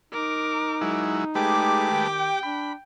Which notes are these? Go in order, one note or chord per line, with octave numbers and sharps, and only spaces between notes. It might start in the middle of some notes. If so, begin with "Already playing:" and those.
D#4 A#4 D6
F#3 G#3 E4
G#3 A3 G4 G#4 B4 D6
D#3 G5
D4 B5